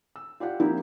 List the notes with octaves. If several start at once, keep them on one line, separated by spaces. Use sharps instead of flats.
E6
F4 G4 D5 F#5
F3 A#3 C4 D#4 E4 G4